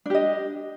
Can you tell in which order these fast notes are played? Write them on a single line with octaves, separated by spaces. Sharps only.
D4 G4 D#5